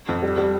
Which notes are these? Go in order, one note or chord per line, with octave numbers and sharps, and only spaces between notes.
F2
G3
G3